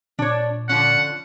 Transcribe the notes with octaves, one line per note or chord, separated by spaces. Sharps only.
A#2 D4 C#5
D3 F3 C#4 F#5